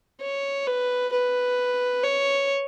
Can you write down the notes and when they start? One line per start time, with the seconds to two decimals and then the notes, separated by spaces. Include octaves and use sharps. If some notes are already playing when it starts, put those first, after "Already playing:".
0.21 C#5
0.67 B4
1.12 B4
2.03 C#5